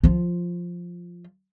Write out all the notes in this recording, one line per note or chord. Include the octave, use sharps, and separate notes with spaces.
F3 F4